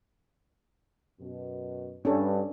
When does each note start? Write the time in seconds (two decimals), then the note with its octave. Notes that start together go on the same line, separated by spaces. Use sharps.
1.20 F#2 B2
2.05 G2 C#4 D4 A4